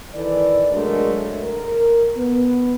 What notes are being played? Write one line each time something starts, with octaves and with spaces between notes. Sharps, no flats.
D#3 E3 A4 D5
F#3 G#3 A3 D4 A#4
A#4
B3